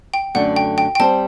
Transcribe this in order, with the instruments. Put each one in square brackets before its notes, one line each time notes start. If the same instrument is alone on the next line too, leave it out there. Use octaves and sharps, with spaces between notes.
[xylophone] G5
[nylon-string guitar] F#2 D3 A3 D4 [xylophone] F#5
[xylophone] G5
G5
G5
[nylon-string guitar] G3 C4 G4 C5 [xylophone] A5